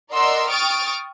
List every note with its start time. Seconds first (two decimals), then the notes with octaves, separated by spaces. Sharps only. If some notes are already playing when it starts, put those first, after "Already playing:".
0.11 A#4 D5 D#5 F#5 C6 E6
0.49 G5 C#6 D#6 F6 A6 D7